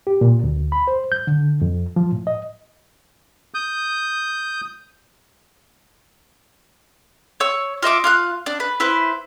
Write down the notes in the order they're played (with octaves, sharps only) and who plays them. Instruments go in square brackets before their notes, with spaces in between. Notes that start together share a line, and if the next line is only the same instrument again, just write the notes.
[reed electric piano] G4
A#2
D2
B5
C5
G6
D3
F2
F3
A2
D#5
[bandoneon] D#6 G6
[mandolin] C#5 C#6 E6
F4 D#5 E5 D6
F4 F5 F#6
D4
B4
E4 B4 C5